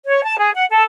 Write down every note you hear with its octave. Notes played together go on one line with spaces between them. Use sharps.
C#5
A5
G#4
F#5
A4